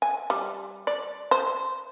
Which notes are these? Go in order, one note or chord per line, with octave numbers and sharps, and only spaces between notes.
G#5
G3
D5
C5